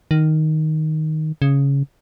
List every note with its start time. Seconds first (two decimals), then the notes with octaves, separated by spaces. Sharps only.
0.11 D#3
1.42 C#3